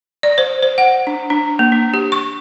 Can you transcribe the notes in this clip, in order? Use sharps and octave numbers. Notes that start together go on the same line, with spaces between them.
D5
C5
C5
F#5
D4
D4
A#3
D4
G4
C#6